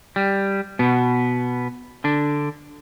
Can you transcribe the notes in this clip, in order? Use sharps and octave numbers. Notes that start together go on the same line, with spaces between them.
G3
B2 B3
D3 D4